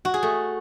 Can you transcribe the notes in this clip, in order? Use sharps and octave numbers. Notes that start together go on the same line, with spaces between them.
F#4
G#4
A3